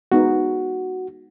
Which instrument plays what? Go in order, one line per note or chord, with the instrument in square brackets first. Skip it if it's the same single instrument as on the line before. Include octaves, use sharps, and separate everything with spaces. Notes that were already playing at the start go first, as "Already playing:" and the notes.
[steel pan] G#3 B3 D#4 [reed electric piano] F#4